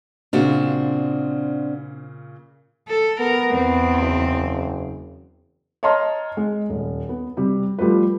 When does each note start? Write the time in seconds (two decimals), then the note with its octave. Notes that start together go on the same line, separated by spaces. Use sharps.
0.33 A#2 C#3 C4 D4 F#4
2.88 A4
3.20 B3 A#4
3.53 E2 C4
4.02 F#1
5.83 C#5 D#5 A5 A#5 C6 F6
6.37 G#3
6.69 D#1
7.09 B3
7.37 C3 G3
7.79 F3 G3 A3 F4 B4